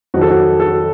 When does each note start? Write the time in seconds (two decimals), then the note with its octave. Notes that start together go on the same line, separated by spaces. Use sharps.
0.14 F2 D#3 F#3 F#4
0.21 A4
0.31 F#4
0.60 A4
0.67 F#4